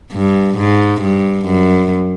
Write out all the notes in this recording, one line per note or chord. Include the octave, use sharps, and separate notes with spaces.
G2
G#2
G2
F#2